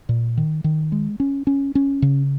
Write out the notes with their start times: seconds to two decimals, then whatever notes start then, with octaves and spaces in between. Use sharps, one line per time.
0.09 A#2
0.37 D#3
0.64 D#3
0.92 G#3
1.20 C#4
1.47 C#4
1.75 C#4
2.02 C#3